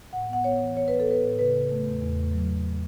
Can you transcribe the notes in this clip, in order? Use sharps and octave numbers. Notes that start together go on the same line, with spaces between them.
A2 F#5
B3 F#5
B3 C#5
E3
B3 C#5
B3 B4
A4
B3 B4
A2
C#3 B4
C#3
A3
E2
E2
A3
F#3
F#3